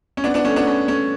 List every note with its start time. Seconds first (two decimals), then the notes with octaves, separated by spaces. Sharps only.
0.17 C#4
0.24 B3 D4
0.34 B3 D4
0.45 A3 C#4
0.56 B3 D4
0.66 A3 C#4
0.88 A3 C#4